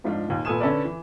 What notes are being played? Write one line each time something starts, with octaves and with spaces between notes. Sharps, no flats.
G#2 F3 D4 F4
D#2 A#2
A#2 A4 B4 G#5 D#6 E7
D3 C#4 A4 B4 D5
E3